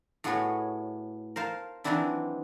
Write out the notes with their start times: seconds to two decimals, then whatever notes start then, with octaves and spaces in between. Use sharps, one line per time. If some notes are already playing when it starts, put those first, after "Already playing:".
0.24 A2 A3 B3 F#4 G#4 C#5
1.36 A#4 C5 F5 A5
1.84 D#3 E3 F#3 C4 D4 E4